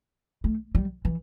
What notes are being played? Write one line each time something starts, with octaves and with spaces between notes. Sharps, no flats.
A3
G3
E3